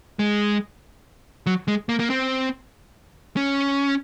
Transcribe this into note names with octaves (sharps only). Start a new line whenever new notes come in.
G#3
F#3
G#3
A#3
A#3
C4
C#4